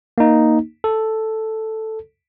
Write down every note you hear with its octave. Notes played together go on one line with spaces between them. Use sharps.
A#3 D#4
A4